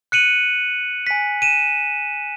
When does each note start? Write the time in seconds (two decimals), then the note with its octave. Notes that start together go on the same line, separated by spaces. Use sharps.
0.12 F#6 C#7 D#7 F#7
1.07 G#5 B6
1.42 D#7 E7